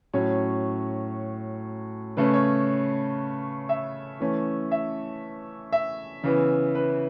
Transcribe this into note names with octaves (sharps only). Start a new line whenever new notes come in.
A2 F#3 C#4 C#5
C#3 A3 C#4 B4
C#5
E5
E3 A3 C#4
E5
E5
C#3 E3 B3
B4